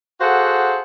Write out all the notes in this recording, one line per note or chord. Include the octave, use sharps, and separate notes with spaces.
F#4 G#4 A4 C5 F5 F#5